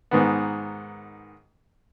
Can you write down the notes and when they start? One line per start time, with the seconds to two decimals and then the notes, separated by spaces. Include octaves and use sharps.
0.11 G#2 D#3 B3